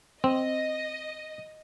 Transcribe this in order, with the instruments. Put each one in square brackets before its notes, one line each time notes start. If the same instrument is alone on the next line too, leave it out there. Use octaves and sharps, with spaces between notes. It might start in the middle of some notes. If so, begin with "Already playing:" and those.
[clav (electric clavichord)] C4 [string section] D#5